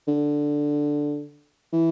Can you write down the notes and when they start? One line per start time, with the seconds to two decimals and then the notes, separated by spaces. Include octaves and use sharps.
0.08 D3
1.73 E3